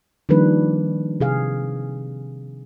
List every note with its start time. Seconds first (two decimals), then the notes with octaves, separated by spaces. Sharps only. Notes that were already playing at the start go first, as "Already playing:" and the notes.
0.29 D#3 F3 G3 A#3 D4 B4
1.20 C3 G#4 F5